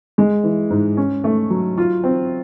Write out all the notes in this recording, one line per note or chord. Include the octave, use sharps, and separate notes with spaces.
G#3
E3
G#2
C#4
A3
F#3
F4
C4